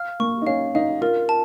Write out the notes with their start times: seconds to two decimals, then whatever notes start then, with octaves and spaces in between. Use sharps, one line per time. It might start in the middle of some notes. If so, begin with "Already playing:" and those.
Already playing: F5 F6
0.20 A#3 C#6
0.42 D#4
0.47 C#4 F5
0.75 D#4 F5
1.02 F4 A#4
1.29 A5